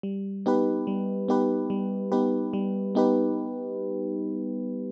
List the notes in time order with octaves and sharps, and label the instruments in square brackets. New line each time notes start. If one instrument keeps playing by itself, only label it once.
[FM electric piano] G3
B3 D#4 G4 B4
G3
B3 D#4 G4 B4
G3
B3 D#4 G4 B4
G3
B3 D#4 G4 B4